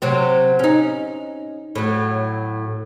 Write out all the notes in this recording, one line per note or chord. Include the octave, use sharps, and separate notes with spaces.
C3 F#3 C4
C#4 D#4
A2 F#3